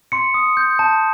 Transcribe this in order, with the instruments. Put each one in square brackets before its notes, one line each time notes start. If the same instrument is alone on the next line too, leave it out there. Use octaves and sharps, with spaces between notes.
[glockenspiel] C6 C#7
D#6
G6
A5